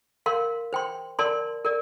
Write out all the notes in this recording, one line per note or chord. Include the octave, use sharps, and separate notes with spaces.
A#4 F5 C6
C5 G5 C6
A#4 D5 A5 C6
A#4 D5